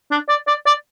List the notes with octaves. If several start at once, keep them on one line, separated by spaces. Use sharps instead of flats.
D4
D5
D5
D5